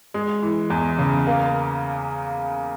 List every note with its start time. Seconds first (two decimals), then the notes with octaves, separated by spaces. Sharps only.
0.14 G#3
0.42 E3
0.70 E2
0.99 C#3
1.27 A#3